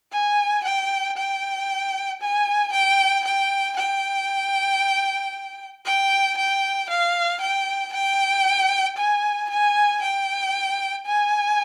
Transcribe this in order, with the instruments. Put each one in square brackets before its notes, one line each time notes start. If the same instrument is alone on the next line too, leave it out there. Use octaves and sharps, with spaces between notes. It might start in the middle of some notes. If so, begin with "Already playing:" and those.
[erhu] G#5
G5
G5
G#5
G5
G5
G5
G5
G5
F5
G5
G5
G#5
G#5
G5
G#5